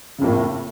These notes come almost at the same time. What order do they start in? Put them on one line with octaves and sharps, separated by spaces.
C#3 F2 A#3 A2